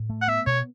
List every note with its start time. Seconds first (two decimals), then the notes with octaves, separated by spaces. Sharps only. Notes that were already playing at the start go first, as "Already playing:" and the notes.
Already playing: A2
0.09 A3
0.22 F#5
0.28 B3 E5
0.46 B2 C#5